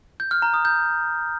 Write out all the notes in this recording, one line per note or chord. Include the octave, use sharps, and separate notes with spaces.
G6
F6
A#5
D#6
G6